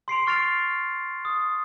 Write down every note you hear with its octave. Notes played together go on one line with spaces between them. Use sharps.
C6 C7 D7 F7
C#6 F6 A6 C7 D7 F7
D#6